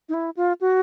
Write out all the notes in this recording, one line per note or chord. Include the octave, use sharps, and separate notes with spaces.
D#4
E4
F4
F#4